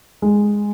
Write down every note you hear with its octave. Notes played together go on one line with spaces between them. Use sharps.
G#3